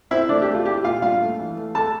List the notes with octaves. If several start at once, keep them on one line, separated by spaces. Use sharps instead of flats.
C4 E4 E5
A3 D4 D5
G4
A3
F4
E4 G4
A#2 F4 F5
G2 F4 F5
A3
E3
A3
A3 A4 A5